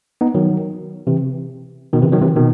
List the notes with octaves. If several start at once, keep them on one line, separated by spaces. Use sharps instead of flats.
B3 D#4
D#3 F#3
C3 E3
B2 D#3
C3 E3
D#3 F#3
C3 E3
B2 D#3